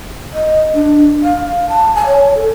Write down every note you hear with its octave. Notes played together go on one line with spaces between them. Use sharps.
D#5
D4
F5
A5
G#5
C#5
A4